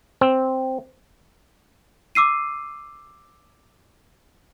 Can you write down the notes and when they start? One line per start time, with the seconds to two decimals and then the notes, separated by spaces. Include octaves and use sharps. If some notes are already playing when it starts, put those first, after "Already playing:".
0.21 C4
2.15 D6 E6 C7 D#7